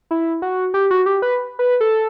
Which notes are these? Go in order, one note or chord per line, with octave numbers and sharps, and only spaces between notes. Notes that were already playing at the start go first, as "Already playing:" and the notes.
E4
F#4
G4
F#4
G4
B4
B4
A4